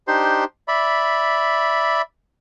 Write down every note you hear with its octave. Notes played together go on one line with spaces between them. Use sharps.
D4 D#4 G4 C5 C6
D5 E5 B5